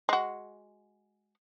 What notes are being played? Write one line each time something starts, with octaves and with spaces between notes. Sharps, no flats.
G#3 F#4